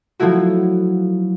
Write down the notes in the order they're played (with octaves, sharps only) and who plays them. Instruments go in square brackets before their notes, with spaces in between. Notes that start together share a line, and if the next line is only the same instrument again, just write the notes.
[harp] F3 F#3 A3 E4 F#4